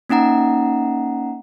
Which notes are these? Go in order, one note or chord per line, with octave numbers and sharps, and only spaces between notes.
A#3 C#4 D#4 F#5 A#5